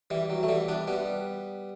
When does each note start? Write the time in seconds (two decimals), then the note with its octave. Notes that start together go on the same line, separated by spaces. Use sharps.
0.10 E3 G3
0.30 F#3
0.43 A3
0.48 E3 G3
0.68 B3 D4
0.88 G3 B3